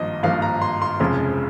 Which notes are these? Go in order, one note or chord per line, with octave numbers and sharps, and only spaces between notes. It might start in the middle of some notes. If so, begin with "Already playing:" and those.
Already playing: G#1 G2 F3 A#3 D#5
G#1 G2 F3 A#3 F5
A#5
C6
C6
F1 F2 C#3 F3 G#3